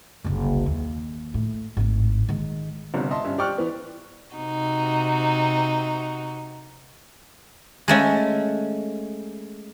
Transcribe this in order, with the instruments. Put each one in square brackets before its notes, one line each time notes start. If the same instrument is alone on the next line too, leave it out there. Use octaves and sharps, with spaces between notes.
[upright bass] F#1 C2
D#2
A2
G#1 A2
D#3 G#3
[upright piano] G1 C2 G2
D#5 E5 A5 C6
G2 C#4 E5
G4 D5 G5 C#6 F6 F#6
E3 B3
[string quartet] C3 D#4 F#4
[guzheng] G#3 A3 C#4